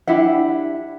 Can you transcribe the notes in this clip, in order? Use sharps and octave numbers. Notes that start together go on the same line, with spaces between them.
D4 E4 G4 F#5